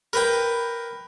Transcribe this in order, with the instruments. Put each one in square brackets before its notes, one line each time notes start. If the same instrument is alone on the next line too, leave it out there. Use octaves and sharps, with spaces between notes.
[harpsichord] A#4 B4 G5